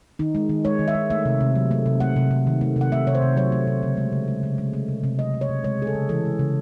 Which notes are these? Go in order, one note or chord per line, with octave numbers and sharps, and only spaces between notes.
D#3 D#4
G#3
D#3
G#3 C#5
D#3
E5
G#3
A3 E5
C3
C3
F#3
A3
C3
A3 F#5
C3
C3
D#3
A3
C3 F#5
A3 E5
C3 C#5
C5
C3
F#3 C#5
A3
C3
C#3
G#3
C#3
G#3
C#3
G#3
A3
C3
C3
F#3 D#5
A3
C#5
C3
G#3 C#5
C#3 G#4
A4
C#3
E3 A4
G#3
C#3